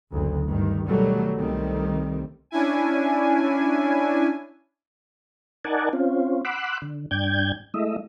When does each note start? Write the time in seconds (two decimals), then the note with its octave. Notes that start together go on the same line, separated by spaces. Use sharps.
0.12 F#1 D2
0.48 G2 D#3
0.88 B2 D#3 F#3 G3 A3
1.37 C2 D#3 G3 A3 C4
2.51 C#4 D4 E4 G#5
5.65 D#4 A#4 D5 F#5 G#5 A5
5.93 C4 C#4 F4
6.45 F#5 B5 C6 D6 E6 F#6
6.82 D3
7.11 G2 D4 G5 G6 G#6
7.74 G#3 A3 E4 D#5 E5